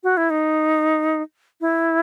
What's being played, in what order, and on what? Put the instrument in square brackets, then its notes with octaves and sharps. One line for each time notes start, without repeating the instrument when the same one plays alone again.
[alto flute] F#4
E4
D#4
E4